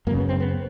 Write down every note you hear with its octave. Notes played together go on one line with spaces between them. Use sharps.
F#2 C#3 A#3
B3
C4
B3